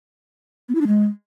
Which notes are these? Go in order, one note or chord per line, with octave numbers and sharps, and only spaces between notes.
B3
E4
D4
G#3